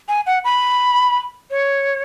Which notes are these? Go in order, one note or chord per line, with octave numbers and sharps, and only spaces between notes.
G#5
F#5
B5
C#5